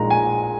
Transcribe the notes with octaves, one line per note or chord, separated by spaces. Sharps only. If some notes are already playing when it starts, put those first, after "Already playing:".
Already playing: A#1 A#2 G#3 D#4 A#5
G#5